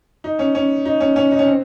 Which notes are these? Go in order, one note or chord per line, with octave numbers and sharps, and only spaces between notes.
D#4
C#4
C#4
D#4
C#4
C#4
D#4
C#4
C4